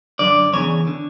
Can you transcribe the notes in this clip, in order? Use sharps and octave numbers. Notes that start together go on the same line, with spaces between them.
F#2 D3 D5
E2 C#3 E3 C#5
D3